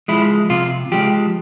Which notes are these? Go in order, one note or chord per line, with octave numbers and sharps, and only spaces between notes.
F3 G#3 E4
C3 F4
F3 G#3 G4